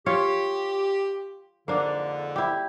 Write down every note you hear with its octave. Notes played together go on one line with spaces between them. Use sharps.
F4 G4 C#5
F2 G#2 D3 A#3 D4
E4 G4